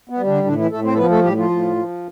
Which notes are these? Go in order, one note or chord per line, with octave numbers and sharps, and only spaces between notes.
B3
G3
D3 D4
A2 D3 D4
E3 E4
A2 A3 A4
C4 C5
A4
F3 B3 B4
A3 A4
A2 G3 G4
F3 F4
A2
F3